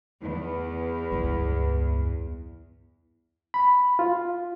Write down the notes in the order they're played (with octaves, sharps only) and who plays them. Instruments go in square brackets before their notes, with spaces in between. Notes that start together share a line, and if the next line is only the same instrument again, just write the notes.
[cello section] E2
[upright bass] C#2 G2
[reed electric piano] B5
F4